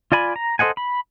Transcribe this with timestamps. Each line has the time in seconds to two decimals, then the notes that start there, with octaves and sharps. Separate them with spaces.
0.12 F4 D5 G#5 B5
0.36 A#5
0.59 A4 C5 D#5 F#5 G#5
0.77 B5